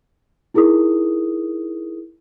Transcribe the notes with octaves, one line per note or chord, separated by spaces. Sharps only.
D#4 E4 G#4 A#4 D#6